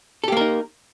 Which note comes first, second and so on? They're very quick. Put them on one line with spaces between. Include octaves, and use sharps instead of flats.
A4 G4 A#3 A#4 D#4